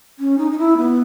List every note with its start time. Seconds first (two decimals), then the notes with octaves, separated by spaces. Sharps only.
0.19 C#4
0.38 D#4
0.51 D#4
0.58 E4
0.78 B3